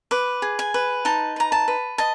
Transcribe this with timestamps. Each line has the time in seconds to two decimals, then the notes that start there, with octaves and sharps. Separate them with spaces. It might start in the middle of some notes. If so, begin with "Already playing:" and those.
0.11 B4 D6
0.42 G#4
0.59 G#5
0.74 B4
1.05 D#4 A5
1.36 B4 A#5
1.52 A5
1.68 B4
1.98 D#5 A5